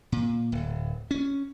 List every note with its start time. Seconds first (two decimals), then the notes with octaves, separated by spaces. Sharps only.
0.12 A#2
0.52 D1
1.11 C#4